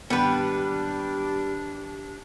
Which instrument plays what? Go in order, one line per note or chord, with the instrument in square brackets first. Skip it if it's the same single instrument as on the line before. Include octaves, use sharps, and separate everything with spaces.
[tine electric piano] G#1 G4 C#7 [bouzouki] G3 B4 [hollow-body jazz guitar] B3 [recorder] D4